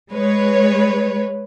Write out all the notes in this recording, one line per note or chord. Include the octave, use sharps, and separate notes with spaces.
G#3 B4 C#5